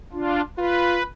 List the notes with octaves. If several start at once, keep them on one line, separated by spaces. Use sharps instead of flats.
D4 F4
F4 B4